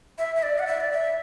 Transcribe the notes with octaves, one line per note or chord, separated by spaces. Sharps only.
E5
E5
D5
F#5
E5
D5
E5